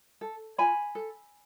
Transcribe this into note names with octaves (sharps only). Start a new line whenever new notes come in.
A4
F4 G#5 B5
A4